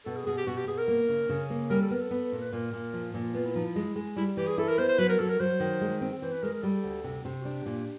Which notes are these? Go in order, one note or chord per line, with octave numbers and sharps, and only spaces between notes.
B2 A4
G#4
B2 G#4
G4
B2 F#4
G4
B2 G#4
A#4
A#3
C#3
C#3
A#3
G3 A#4
A4
B3 A#4
A4
B3
A#2
B4
A#2 A#4
A#2
F3
A#2
B3 F4
E4
F3 D#4
E4
G#3
G#3
G3 E4
E3 G4
G#4
E4 A4
A#4
B3 C5
C5
F#3 B4
A#4
F#3 A4
A#4
F#3 C5
D#3
G#3
C4
E3 C5
B4
G#3 A#4
A#4
G3 A4
D2
C3
C3
F#4
D4 G4
A#2